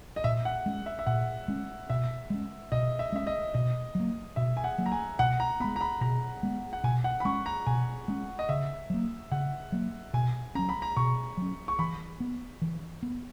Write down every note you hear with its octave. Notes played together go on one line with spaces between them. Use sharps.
D#5
A#2 E5
F#5
G#3 C#4
E5
E5
A#2 F#5
G#3 C#4
B2 E5
G#3 C#4
B2 D#5
E5
G#3 C#4 E5
D#5
B2 D#5
F#3 A#3
B2 E5
G#5
F#5
F#3 A#3
A#5
G#5
B2 F#5
A#5
G#3 B3 B5
A#5
B5
B2 A#5
G#3 B3
F#5
B2 G#5
F#5
B5
G#3 C#4 C#6
A#5
B2 G#5
G#3 C#4
D#5
C#3 E5
F#3 A#3
C#3 F#5
F#3 A#3
B2 G#5
F#3 C#4 A#5
B5
A#5
B2 C#6
F#3 C#4
C#6
E3 B5
B3
E3
B3